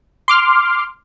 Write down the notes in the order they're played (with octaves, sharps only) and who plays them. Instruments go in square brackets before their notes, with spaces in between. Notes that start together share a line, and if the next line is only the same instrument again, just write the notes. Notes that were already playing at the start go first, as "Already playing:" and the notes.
[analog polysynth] C6 D6 F6